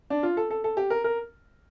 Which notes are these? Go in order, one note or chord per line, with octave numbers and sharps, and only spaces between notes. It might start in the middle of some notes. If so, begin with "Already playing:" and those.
D4
F4
A4
A4
A4
G4
A#4
A#4